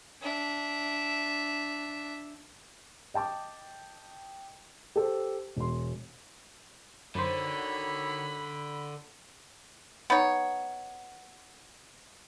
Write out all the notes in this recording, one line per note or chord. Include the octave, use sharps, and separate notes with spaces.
D4 E5
D#5 G5 A5 D6
G4 A4 C5
E1 C6
F#2 D3 D#3 F#4 C5 C#5 B5
B3 D#4 C#5